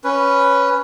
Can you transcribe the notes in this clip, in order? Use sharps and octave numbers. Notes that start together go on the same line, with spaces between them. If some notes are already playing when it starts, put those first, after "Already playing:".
C#4 B4